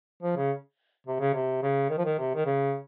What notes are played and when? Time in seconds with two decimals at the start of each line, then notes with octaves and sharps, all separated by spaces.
0.23 F3
0.37 C#3
1.07 C3
1.20 C#3
1.34 C3
1.63 C#3
1.90 D#3
1.98 F3
2.05 D#3
2.19 C3
2.35 D#3
2.46 C#3